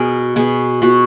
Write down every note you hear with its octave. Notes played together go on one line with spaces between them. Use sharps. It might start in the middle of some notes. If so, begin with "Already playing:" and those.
Already playing: B2 G#4 A#4
B2 G#4
B2 F#4